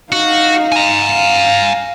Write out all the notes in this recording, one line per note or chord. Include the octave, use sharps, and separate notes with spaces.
D#4 F#4 F5
G#5 A#5
F5